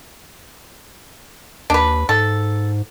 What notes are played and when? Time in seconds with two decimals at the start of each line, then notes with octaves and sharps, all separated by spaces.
1.70 D#2 D4 B4
2.09 G#2 A4